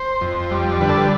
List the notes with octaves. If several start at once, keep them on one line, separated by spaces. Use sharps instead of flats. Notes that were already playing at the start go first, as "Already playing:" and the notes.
Already playing: C5
F2
G3
D3 B4
A4
B4